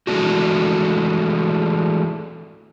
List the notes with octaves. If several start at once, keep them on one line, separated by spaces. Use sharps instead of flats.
E3 G#3 A3 B3 D4 F#4